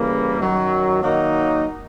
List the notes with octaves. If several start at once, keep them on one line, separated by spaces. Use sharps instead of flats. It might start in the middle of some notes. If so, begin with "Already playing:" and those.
Already playing: C#3 E3 G3 A#3
F#2 D#3 F#3
D#3 F#3 A#3 D#4